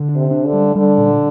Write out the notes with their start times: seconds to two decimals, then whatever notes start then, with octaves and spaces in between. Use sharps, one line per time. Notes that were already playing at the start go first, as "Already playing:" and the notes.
Already playing: D3
0.09 D4
0.16 C3
0.31 D4
0.46 D3
0.53 G3
0.75 D3 G3
0.98 A#2